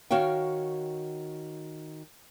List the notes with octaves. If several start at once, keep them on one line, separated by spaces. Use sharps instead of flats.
D#3 F#4 C#5 F5 G5